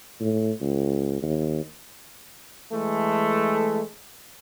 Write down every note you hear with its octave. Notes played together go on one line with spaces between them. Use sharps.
A2
C#2
D#2
E3 G#3 A3